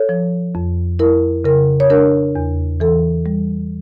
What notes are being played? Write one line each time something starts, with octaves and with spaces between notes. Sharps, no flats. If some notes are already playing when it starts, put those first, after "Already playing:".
Already playing: A4 C#5
F3
F2
E4 A#4
C#3 A#4
C#5
D4 A#4
E2
E3 A4
G3